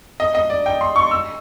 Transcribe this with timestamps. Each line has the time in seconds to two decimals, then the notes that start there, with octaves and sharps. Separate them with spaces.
0.20 D#5
0.35 D#5
0.50 D5
0.66 G5
0.81 C6
0.96 C#6
1.11 E6